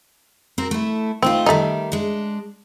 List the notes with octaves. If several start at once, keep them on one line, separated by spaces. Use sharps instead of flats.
C4 F#4 A#4
A3 E4
A3 C4 D#4 F4
D#3 G3 A3 D#4
G#3 D4